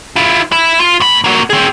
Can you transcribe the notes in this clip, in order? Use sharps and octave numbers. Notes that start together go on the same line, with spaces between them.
E4 F4
E4
F4
A2 B5
A#3 F#4
C4 G#4